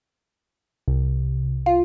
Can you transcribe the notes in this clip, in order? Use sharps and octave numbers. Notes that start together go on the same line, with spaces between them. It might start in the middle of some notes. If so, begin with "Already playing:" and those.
C2
F4